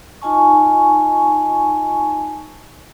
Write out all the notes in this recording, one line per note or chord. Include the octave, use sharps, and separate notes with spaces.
D#4 F4 D#5 G#5 A5 C#6